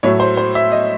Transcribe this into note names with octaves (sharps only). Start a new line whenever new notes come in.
A2 F#3 A3 C#5
C5
C5
E5
D#5